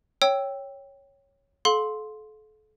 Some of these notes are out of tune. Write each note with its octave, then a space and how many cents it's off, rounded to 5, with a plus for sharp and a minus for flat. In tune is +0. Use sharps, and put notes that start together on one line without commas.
C#5 +0 G5 +0 E6 +0
A4 -35 F5 +25 C6 +0